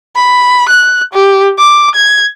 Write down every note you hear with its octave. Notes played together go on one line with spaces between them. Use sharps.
B5
F#6
G4
D6
G#6